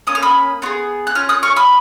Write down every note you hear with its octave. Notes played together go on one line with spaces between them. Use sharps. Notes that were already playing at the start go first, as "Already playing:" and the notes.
A#3 C#4 D#6
F6
B5 D#6
B3 F4 G#4
F#6
C#4 F4 F6
D#6 F#6
C#6 F6
B5 D#6